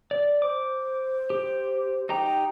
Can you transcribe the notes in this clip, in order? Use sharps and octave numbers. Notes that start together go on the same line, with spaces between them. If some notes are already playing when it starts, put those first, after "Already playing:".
D5
C5 D6
G4
D#4 G4 G5 A#5